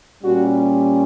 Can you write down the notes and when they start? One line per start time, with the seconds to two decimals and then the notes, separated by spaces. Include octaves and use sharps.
0.22 A#2 G3 C#4 F#4